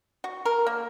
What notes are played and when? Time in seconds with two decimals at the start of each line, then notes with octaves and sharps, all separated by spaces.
0.24 F#4
0.45 A#4
0.67 A#3